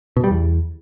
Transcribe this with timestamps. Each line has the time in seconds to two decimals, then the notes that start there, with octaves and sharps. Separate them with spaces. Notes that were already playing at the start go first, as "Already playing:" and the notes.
0.17 B2
0.24 G3
0.31 E2